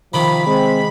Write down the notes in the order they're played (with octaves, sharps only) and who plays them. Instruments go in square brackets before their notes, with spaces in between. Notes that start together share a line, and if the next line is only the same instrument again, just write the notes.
[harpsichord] C3 D#3 [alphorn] F3 [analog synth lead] B5
[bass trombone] G#3 [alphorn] C4